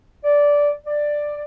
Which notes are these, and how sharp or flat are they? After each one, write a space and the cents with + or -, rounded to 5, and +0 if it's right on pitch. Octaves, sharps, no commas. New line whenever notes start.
D5 -10
D5 +10